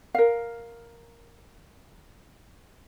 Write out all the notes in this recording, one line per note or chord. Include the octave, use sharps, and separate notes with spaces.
A#4 F5